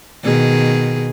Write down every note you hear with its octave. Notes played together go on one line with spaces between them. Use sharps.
B2 D#3 G#4